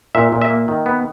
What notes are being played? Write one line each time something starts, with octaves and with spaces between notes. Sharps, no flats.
A#2 E5
A#2
E5
A#3
D#3
B3